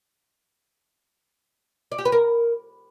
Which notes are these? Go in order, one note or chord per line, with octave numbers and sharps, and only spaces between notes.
D5
G4
B4
A#4